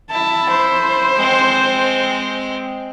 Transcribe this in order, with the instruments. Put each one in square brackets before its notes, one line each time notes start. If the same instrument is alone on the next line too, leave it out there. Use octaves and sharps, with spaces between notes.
[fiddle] E4 [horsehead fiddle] A5
[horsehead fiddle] C5
[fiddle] G#3 C4